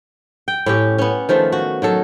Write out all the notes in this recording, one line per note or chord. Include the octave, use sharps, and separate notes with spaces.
G5
A2 C#4 G4
B3 C#4
D#3 F3 A3
F#4
D#3 F#3 A4